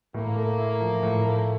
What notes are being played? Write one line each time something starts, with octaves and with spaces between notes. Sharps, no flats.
A2 A#3
A3
E4
F3
A2
A3